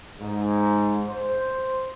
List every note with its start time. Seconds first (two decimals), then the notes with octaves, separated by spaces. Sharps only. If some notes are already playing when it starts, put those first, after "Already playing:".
0.21 G#2
1.08 C5